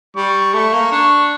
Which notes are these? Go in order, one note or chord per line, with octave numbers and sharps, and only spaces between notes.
G3 C#6
A3 C#6
A#3
D4 C#6